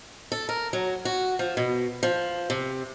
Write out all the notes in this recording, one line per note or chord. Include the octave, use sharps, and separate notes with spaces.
A4
A#4
F#3
F#4
F3
B2
F3
C3